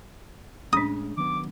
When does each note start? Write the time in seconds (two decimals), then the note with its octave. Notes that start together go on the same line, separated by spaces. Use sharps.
0.73 A2 G#3 C#4 D4 D#6
1.17 D#3 F#3 B3 D6